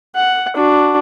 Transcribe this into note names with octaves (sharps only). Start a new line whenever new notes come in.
F#5
D4 F#4